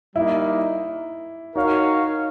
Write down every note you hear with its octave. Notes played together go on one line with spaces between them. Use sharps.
G3 A#3 D#4 E4
D#4 F#4 A#4 C#5 F5